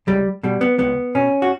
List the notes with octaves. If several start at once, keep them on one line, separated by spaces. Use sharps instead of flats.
C#2 G3
B2 G3
B3
C#2 B3
B2 C#4
F#4